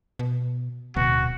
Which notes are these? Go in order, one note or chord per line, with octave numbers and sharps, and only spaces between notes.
B2
D1 B2 F#4